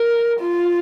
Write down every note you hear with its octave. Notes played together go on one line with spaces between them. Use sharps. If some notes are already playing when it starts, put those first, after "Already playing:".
Already playing: A#4
F4